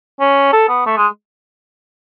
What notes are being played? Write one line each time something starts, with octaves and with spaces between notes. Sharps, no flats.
C#4
A4
B3
A3
G#3